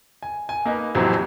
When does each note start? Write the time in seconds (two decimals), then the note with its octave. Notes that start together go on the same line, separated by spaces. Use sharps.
0.23 G#5
0.49 G#5
0.65 A#3 D#4 B4
0.95 A1 F2 C3 E3 F#3 C4